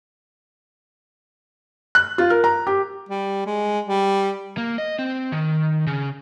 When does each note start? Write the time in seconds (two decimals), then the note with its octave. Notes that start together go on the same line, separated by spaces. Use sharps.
1.95 F#6
2.18 F4
2.30 A#4
2.44 A#5
2.67 G4
3.09 G3
3.46 G#3
3.85 G3
4.58 A#3
4.78 D#5
4.99 C4
5.32 D#3
5.87 C#3